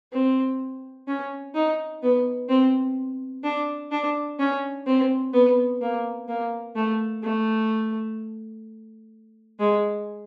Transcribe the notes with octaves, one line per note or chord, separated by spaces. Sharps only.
C4
C#4
D#4
B3
C4
D4
D4
C#4
C4
B3
A#3
A#3
A3
A3
G#3